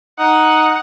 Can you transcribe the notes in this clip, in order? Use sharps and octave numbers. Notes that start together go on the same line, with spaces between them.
D#4 F#5